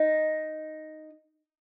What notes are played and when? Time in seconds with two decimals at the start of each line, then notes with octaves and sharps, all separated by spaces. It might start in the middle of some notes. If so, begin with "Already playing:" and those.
Already playing: D#4